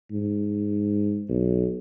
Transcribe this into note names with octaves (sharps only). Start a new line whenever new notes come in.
G#2
B1